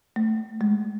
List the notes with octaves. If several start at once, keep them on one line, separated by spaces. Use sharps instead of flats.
A3
G#3